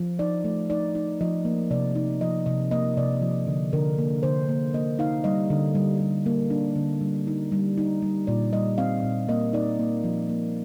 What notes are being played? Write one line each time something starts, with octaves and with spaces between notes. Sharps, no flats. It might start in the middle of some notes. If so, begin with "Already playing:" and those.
Already playing: F3
D#4 D5
A3
D#4 D5
D#4
F3 D#5
A#3
C3 D5
D#4
F3 D#5
C3 D#5
A#3 D#5
C3 D5
F3
D3
D3 A#4
A#3
D3 C5
A#3
A#3 D#5
D#4 F5
G3 D#5
D3
G3
G3
A#3
D4
D3
G3
D#4
G3
D#4
G3
A#2 D5
G3 D#5
C4 F5
A#2
A#3 D#5
D#4 D5
A#3
F3
A#3